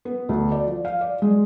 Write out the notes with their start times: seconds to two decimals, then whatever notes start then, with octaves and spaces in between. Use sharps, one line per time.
0.05 B3
0.29 D2
0.52 D5
0.67 F3
0.85 F5
1.01 D5
1.22 G#3